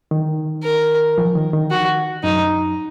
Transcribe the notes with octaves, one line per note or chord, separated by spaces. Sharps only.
D#3
A#4
F3
D#3
D#3
F#4
F#2 D#4